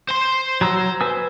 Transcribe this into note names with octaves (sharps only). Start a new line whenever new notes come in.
C5 C6
F#3 A#5 E6
B4 G#5 E6